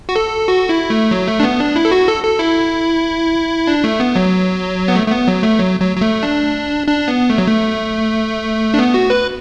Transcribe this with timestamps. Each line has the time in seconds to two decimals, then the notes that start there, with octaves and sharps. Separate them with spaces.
0.09 F#4
0.16 A4
0.48 F#4
0.69 E4
0.90 A3
1.11 F#3
1.28 A3
1.40 D4
1.43 B3
1.60 D4
1.76 E4
1.85 A4
1.91 F#4
2.08 A4
2.24 A4
2.39 E4
3.67 D4
3.84 A3
4.00 B3
4.16 F#3
4.88 B3
4.96 A3
5.08 A3
5.11 B3
5.28 F#3
5.43 A3
5.59 F#3
5.81 F#3
5.97 F#3
6.01 A3
6.23 D4
6.87 D4
7.08 B3
7.30 A3
7.38 F#3
7.47 A3
8.74 D4
8.79 B3
8.94 F#4
9.10 B4